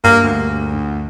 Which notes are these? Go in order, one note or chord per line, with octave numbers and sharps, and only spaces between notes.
G2 A#3
D2